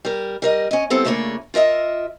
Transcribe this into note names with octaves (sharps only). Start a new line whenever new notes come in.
G3 A#4
G3 A#4 D#5
C#4 D#5
G3 B3 C4 E4 A4
C#3 A3 A#3 D4 F4 C#5
F4 A#4 D#5 E5